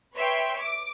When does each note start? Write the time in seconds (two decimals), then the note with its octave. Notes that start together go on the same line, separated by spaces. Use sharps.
0.15 B4 C#5 E5 G5 C6
0.60 D6 D7